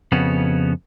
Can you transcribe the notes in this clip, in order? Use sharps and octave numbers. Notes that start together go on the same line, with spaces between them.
F2 C#3 B3 C#4 F#4